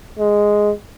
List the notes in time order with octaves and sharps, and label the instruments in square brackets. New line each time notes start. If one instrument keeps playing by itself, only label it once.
[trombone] G#3